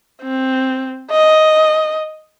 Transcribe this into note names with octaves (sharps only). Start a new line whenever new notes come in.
C4
D#5